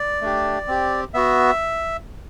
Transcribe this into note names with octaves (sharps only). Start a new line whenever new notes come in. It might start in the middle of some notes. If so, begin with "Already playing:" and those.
Already playing: D5
A3 D4 G4
C4 G4
B3 F#4 E5